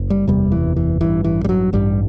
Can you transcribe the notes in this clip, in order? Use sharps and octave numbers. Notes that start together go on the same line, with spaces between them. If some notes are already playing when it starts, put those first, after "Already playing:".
Already playing: F#1
G3
F#1 E2 C3 G3
E3
E3
A1 G2 E3
E3
G3
F#3
A1 G2 G3